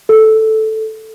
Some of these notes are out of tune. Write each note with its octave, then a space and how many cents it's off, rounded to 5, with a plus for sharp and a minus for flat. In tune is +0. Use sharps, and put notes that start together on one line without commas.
A4 -5